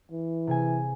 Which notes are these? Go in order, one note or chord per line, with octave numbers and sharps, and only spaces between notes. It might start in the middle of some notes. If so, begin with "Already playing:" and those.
E3
C3 G#4 G#5